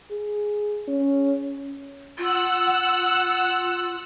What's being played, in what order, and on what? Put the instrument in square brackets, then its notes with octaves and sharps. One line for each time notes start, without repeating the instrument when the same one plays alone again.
[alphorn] G#4
C#4
[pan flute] F4 [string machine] F#5 E6 F#6